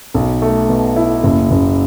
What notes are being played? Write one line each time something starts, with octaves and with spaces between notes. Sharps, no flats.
B1
A3
B2
E4
F#1
F#1